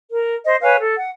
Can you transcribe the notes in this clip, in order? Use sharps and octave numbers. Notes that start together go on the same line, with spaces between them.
A#4
C5 D#5
B4 C#5 F5 G#5
A4
F#5